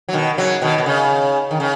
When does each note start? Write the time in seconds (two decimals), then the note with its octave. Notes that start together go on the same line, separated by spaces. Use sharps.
0.09 F#3
0.13 B2 D#3
0.37 C#3 F#3
0.62 B2 D#3
0.78 B2
0.86 C#3
1.51 D#3
1.60 C#3